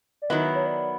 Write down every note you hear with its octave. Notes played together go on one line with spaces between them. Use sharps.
D5
D#3 F#3 B3 E4 D#5
C#5
D5